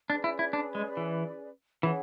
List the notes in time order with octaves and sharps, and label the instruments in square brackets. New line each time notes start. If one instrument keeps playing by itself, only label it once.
[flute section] C#4 G#4 B4 D5 [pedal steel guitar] D4
[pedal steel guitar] E4
E4
D4
G#3
E3
[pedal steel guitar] E3 [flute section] C#4 G#4 C#5 F#5